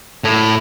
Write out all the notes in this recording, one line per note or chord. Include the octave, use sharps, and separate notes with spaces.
A2